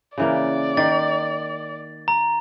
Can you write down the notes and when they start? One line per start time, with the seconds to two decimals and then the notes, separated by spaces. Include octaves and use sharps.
0.18 C#3 E3 A#3 D5
0.77 D#3 A6
2.08 A#5